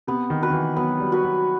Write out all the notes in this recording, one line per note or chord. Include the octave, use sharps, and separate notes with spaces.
C3 B3
D#3
F#4 B4
D#3
E3
F#3 B3
G3
F#4 B4
F#3